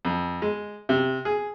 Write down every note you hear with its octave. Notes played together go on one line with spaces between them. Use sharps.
F2
G#3
C3
G#4